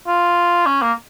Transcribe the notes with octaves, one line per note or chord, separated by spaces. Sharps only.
F4
C#4
A#3